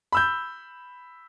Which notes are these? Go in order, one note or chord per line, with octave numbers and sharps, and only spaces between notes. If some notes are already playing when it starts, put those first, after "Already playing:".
B5 E6 G6